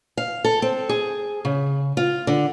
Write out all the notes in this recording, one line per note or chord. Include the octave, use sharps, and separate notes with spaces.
F5
A4
C4
G#4
C#3
F4
D3